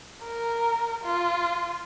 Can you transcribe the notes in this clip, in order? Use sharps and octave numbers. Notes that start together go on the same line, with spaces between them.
A#4
F4